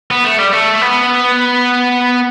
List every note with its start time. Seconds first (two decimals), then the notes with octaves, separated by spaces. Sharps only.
0.11 B3
0.24 A3
0.39 G3
0.53 A3
0.81 B3